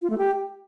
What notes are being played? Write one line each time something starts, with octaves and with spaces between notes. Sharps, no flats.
F4
A3
G4